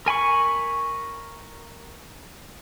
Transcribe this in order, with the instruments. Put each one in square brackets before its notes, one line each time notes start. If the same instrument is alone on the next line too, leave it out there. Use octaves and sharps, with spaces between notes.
[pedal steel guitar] A#4 G#5 B5 C#6